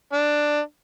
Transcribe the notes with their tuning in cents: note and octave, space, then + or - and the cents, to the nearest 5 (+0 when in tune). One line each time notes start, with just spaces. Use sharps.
D4 +10